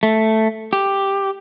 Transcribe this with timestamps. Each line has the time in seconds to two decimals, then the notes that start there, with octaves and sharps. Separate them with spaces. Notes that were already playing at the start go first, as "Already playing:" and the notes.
0.03 A3
0.73 G4